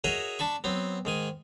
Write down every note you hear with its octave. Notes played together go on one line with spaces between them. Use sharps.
F#4 G#4 A#4 C#5 D#5 E5
D4 A5 B5 C#6
F#3 B3 C4
G#2 D#3 G#5